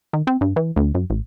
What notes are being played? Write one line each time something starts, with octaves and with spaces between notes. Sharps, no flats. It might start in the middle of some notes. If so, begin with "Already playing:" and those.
D#3
C4
G2
E3
D2
F#2
A1